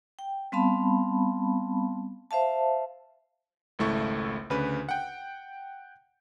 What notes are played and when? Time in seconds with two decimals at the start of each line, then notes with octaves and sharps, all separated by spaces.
0.19 G5
0.52 G3 B3 C4 F5 A5 B5
2.31 C5 E5 F5 A5
3.79 G#1 C#2 A3 E4 C#6
4.50 D2 C#3 B4
4.89 F#5 G5